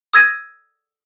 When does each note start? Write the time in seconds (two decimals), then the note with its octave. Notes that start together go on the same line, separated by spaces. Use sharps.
0.13 D#6 E6 G#6 A#6 D#7